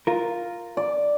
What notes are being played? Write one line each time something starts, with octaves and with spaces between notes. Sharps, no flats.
F4 A#4
D5